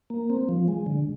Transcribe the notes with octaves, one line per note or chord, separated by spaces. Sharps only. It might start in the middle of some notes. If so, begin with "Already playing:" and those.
A#3
C4
F3
G#3
D3